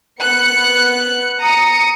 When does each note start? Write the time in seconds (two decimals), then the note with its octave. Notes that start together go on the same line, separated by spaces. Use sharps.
0.21 B3 F#6 C#7
1.39 A#5 D#6 C#7